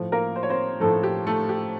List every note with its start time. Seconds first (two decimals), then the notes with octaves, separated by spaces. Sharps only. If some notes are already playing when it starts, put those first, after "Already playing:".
Already playing: A2 F3
0.12 A#3 A#4
0.36 C5
0.43 C#5
0.50 C4 C5
0.80 A2 F3 A3 A4
1.03 G4
1.27 A3 A4
1.49 G4